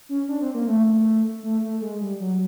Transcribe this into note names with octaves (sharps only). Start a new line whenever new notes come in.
C#4
D4
C4
A#3
A3
A3
A3
G#3
G3
F#3